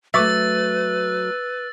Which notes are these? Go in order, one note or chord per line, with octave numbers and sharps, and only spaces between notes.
F#3 A3 B4 E5 C#6 D6 E6 A6